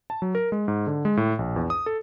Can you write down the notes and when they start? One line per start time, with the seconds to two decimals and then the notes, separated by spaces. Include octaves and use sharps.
0.10 A5
0.22 F#3
0.35 A#4
0.52 G#3
0.68 G#2
0.87 D3
1.05 G#3
1.17 A2
1.39 A#1
1.56 E2
1.70 D#6
1.86 A4